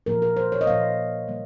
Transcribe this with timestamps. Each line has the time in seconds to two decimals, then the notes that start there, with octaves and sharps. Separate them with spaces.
0.06 A#2 F3 A#3 A#4
0.22 A#4
0.37 C5
0.52 C#5
0.61 D#5
0.67 A#2 F3 A#3 F5
1.27 C#3 G3 A#3